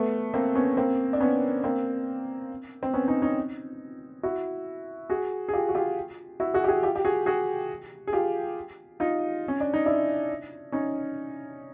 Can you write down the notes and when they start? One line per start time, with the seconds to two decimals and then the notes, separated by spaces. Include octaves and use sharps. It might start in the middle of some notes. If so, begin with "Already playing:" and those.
Already playing: A3 B3
0.34 A#3 C4
0.55 B3 C#4
0.77 A#3 C4
1.13 D4
1.20 B3 C#4
1.64 A#3 C4
2.83 C4
2.94 B3 C#4
3.08 C#4 D#4
3.22 C#4 D#4
4.23 E4 F#4
5.10 F#4 G#4
5.49 G#4
5.53 F4 G4
5.69 F#4
5.75 F4 G4
6.40 E4 F#4
6.54 F#4 G#4
6.64 G4
6.68 F#4 G#4
6.83 F4 G4
6.96 G4
7.05 F#4 G#4
7.26 F#4 G#4
8.07 G#4
8.13 F4 G4
9.00 D#4 F4
9.48 C#4
9.60 D4
9.74 D#4
9.86 D4 E4
10.72 C#4 D#4